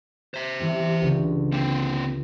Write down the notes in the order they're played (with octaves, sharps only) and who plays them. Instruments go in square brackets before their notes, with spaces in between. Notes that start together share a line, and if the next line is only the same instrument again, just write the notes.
[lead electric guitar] C5 E5
[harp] E3 G3 C4
C#2 D3 C#4
[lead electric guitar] A#3 C4